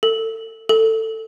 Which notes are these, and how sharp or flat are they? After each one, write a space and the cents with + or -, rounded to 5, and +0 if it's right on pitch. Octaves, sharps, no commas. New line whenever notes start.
A4 +30
A4 +15